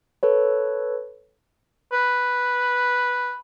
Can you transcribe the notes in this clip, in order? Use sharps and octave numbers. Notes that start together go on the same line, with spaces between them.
A4 B4 C#5
B4